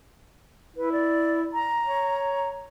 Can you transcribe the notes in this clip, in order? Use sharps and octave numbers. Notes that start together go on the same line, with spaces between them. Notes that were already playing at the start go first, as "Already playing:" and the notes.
E4 B4
D5
A#5
C#5